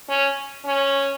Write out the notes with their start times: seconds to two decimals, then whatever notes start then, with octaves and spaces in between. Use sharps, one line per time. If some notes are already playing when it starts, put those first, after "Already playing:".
0.09 C#4
0.65 C#4